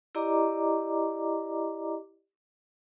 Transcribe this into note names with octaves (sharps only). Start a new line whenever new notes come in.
E4 G4 D5 D#5 A#5 D6